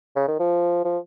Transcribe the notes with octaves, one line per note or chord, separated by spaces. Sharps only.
C#3
D#3
F3
F3